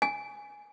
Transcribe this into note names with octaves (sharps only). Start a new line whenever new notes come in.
G#5